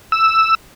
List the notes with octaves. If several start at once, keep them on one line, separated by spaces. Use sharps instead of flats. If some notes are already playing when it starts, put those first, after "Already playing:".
E6